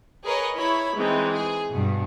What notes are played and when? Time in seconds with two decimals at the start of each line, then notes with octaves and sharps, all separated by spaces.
0.24 G#4 A#4 B4 C#5 D#5
0.56 E4 C#5 B5
0.96 E3 G#3 C4 D#4
1.32 G#4
1.75 G2 B2